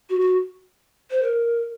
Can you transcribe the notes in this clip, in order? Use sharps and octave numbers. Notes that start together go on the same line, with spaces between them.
F#4
F#4
C5
A#4